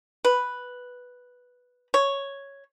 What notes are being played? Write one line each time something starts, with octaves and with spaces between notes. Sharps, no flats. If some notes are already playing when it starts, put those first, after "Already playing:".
B4
C#5